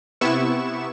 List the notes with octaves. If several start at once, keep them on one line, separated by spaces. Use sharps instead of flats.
C3 B3 E4 C#6 E7